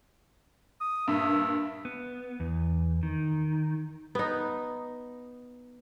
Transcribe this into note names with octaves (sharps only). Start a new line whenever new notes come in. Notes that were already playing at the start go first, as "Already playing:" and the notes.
D#6
G2 A#2 E5
B3
E2
D#3
B3 D#4